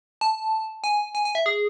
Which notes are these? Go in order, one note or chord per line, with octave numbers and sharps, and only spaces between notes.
A5
G#5
G#5
G#5
E5
G#4